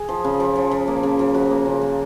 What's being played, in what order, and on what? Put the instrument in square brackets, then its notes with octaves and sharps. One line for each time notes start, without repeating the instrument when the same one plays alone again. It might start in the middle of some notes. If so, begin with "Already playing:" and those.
Already playing: [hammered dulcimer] G#4
F3
C#3
F3
F3
F3
A#3
C#3
F3
F3 F#4
A#3
C#3
A#3